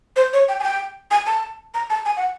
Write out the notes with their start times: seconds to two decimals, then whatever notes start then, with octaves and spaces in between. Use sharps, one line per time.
0.16 C5
0.33 C#5
0.49 G5
0.60 G#5
0.64 G5
1.11 G#5
1.27 A5
1.74 A#5
1.90 A5
2.05 G#5
2.17 F#5